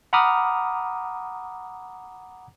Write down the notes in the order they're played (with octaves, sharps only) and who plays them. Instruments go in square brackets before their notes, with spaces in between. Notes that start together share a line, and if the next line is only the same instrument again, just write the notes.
[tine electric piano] F#5 A#5 B5 D6 D#6 F6